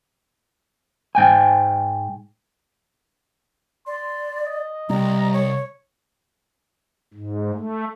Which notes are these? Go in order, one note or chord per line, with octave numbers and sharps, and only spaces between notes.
G#2 G5 G#5
D5 C6
D#5
C2 G3 A#5
C#5
G#2
A3